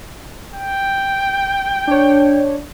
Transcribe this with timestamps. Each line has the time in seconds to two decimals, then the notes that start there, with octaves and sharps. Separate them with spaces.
0.55 G5
1.87 D4 C#5